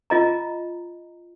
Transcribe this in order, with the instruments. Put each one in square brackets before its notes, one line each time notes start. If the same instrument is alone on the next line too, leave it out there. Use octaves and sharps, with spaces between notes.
[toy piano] F4 D#5 A#5